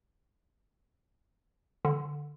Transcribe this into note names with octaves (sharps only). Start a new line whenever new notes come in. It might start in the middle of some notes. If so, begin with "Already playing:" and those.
D3